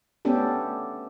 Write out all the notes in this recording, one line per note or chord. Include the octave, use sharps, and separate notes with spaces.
A3 B3 C#4 D4 G4 A4